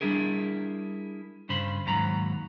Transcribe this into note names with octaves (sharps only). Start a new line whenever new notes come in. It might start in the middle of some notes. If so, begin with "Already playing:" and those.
G3 D4 E4 G#4 A#4
G2 C#3 C5 B5 C6
D#2 G#2 F#3 A#5 B5